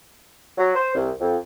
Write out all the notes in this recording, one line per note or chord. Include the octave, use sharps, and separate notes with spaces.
F#3
C5
C2
F2